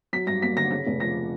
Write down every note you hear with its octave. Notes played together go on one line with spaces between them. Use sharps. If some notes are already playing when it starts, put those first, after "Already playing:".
F#3 B6
G2 A#6
A#3 B6
D3 A#6
C#3 A#6
F1
F3 A#6